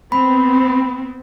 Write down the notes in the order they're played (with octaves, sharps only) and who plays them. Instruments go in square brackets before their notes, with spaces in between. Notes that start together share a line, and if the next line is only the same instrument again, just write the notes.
[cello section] B3 C4 [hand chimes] B5